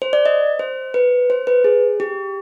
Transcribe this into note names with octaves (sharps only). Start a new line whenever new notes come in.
C5
D5
D#5
C5
B4
C5
B4
G#4
G4